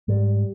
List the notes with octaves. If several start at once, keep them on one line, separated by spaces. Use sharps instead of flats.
G#2 G3